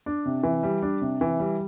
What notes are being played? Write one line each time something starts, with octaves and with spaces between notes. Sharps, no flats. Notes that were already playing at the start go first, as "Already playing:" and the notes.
D4
C3
E3
G3
D4
C3
E3
G3